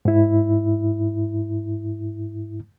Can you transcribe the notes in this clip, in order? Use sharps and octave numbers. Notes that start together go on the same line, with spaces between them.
G#2 E4